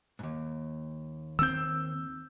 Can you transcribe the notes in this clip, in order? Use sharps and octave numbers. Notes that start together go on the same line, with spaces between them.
D#2 G#2
D#3 C4 E6 G6